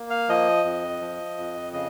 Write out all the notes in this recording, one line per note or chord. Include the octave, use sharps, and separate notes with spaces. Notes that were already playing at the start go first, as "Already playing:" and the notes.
Already playing: A#3
F5
F3 D#5
F2
F3
F2
C#3 D#5